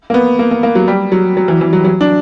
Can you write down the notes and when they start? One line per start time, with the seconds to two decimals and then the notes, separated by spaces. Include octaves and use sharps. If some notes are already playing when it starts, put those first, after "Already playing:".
0.10 A#3
0.14 B3
0.39 A#3
0.51 A#3
0.63 A#3
0.75 F#3
0.88 G3
1.12 F#3
1.37 F#3
1.48 E3
1.61 E3
1.73 F#3
1.85 F#3
2.01 D4